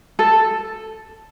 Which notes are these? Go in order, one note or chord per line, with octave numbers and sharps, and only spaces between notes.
A4